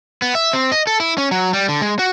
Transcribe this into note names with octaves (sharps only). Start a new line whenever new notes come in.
B3
E5
C4
D#5
A4
E4
C#4
F#3
G3
D3
G#3
F#4